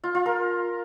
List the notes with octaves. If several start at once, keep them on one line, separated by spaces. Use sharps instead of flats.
F4
F4
A#4